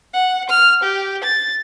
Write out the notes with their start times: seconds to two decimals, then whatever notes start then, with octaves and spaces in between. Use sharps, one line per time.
0.14 F#5
0.49 F6
0.83 G4
1.24 A6